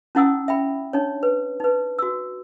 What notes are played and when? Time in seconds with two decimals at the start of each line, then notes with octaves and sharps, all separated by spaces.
0.15 C#4 D#4 E4 F#5 D#6 E6
0.48 E5 G5 B5
0.93 D4 D#4 C#5
1.23 B4
1.60 D#4 B4
1.99 F#4 E6